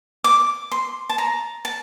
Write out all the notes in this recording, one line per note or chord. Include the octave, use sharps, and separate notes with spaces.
D6
C6
A5
A#5
A5